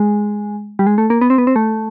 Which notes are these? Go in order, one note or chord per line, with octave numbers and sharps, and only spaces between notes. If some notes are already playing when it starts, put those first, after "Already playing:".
Already playing: G#3
G3
G#3
A3
A#3
B3
C4
B3
C4
A3